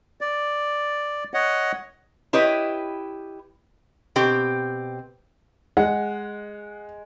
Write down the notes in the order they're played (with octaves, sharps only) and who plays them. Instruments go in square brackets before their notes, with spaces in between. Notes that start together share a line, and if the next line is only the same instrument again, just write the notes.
[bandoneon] D5
C#5 D#5 F#5
[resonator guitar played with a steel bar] E4 G4 B4 C#5 D#5
B2 C4 G4
[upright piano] G#3 [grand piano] F#5